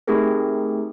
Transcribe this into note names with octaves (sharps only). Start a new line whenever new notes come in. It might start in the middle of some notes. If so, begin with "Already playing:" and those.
A3 C4 D#4 G4 G#4 A#4